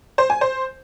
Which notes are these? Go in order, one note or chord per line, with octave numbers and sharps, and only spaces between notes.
C5
G#5
C5